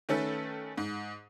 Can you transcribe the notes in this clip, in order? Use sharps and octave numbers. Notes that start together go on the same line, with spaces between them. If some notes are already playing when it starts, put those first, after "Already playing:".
D#3 A3 C#4 A4 B4
G#2